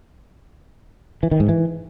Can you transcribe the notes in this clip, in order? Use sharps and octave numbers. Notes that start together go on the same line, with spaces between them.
E3
D#3
G#2
E3